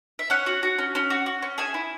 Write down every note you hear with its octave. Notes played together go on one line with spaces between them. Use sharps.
E5
C#4 C#5 F#5
F#4
F#4
C#4
C#4
F#4
F#4
C#4
G#4 E5 G#5
E4